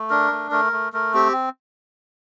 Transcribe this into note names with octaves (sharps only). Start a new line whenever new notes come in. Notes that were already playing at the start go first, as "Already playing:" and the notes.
Already playing: A3
D4 A#4
A3
A3 A#4
A3
A3 A#4
C4 G4